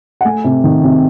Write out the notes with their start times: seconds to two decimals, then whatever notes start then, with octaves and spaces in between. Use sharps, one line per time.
0.21 F#5
0.25 A3 G#5
0.44 C3
0.64 D#3
0.83 C3